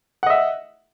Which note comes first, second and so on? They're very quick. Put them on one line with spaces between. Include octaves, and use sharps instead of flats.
F#5 D#5 E5